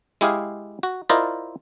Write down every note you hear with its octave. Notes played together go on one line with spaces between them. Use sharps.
G#3 E4 G4 G#4 F5
F#4
E4 F4 A#4 C5 D5 D#5